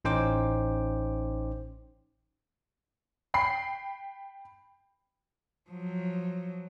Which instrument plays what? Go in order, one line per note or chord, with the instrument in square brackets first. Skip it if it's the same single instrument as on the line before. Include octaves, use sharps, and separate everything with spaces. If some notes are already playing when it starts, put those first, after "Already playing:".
[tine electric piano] A1 C#4 D#4 C5 G5 D6
[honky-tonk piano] G5 B5 C7
[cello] F3 F#3